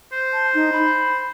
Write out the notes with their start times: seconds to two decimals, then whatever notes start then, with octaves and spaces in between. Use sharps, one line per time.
0.12 C5
0.32 A5
0.54 D#4
0.72 B5